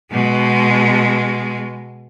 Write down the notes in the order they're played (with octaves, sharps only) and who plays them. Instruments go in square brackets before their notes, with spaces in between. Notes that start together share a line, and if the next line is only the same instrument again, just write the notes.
[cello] B2 G#3